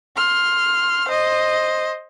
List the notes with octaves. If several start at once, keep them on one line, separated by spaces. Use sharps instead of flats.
C6 F6
C5 D#5